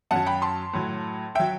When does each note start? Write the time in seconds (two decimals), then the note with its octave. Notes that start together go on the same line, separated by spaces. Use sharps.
0.11 F#2 F#3 F#5 A5
0.26 G5 B5
0.42 A5 C6
0.73 A2 F#3
1.35 F#3 E5 G5